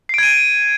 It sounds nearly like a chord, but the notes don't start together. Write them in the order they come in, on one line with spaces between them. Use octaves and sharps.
C7 D7 G#6 D#7